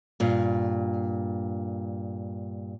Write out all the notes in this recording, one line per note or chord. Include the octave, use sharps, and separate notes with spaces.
G2 A#2